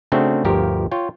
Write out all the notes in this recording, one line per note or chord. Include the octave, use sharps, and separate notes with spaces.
C#3 A3 C4 D4 F#4
G1 D2 F3 G4 A#4
F4 C#5 G5